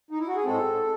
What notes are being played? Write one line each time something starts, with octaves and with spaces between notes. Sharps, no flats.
D#4
E4
F#4
G#4
A2 G#3 C4 A4